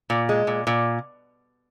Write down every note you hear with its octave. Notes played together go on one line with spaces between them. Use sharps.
A#2
G#3
A#2
A#2